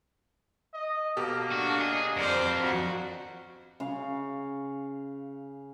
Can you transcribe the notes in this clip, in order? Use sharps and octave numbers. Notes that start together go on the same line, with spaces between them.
D#5
B2 A#3 G4 A4
D4 F#4
G#4 D#5
F2 A#4 C5 D5
F#4
C#3 F5